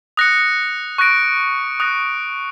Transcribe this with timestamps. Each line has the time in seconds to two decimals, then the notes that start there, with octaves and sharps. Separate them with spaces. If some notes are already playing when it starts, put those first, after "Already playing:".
0.17 D#6 F#6 A#6 C#7
0.98 C#6 F#6 A#6 D7
1.80 D#6 F#6 A#6